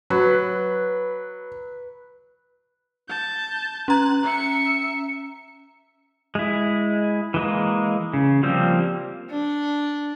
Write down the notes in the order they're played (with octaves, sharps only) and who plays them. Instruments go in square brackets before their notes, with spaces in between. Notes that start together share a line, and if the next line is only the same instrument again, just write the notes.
[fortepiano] F#3 [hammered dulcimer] B4
[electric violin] A5 G6
[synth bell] C#4 A#5 [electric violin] F#6
[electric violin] E5 C#7
[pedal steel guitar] G#3 E4
E3 G#3 A#3
C#3
F3 G3 A#3 C4
[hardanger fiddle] D4